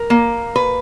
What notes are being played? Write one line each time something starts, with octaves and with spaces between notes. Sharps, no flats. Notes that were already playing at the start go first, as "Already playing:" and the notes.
Already playing: A#4
A#3
B4